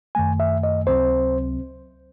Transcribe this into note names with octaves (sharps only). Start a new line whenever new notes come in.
F#2 D#3 A3 G#5
E5
D#5
C#2 C3 F#3 C4 C5